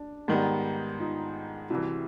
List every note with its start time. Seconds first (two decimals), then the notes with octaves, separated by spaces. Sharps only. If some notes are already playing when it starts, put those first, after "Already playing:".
Already playing: D4
0.28 G#2 D#3 G3 B3
0.99 D#4 F4
1.70 C2 C3 E3 E4 F#4